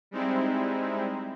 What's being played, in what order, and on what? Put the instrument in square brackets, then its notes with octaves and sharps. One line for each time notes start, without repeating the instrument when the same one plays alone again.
[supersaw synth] G3 G#3 C4 D#4 E4